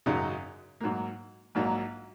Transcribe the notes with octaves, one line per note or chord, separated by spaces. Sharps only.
G#1 F#2 C#3 F#3 D#4
G#2 F#3 A#3
A#1 G#2 F#3 A#3